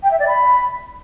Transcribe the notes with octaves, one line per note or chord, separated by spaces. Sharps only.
G5
E5
D5
B5